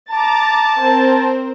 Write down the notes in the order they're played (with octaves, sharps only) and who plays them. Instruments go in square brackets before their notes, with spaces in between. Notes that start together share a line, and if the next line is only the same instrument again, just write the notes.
[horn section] A5 [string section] A#5 D6 A6
[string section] C4 A#4 C5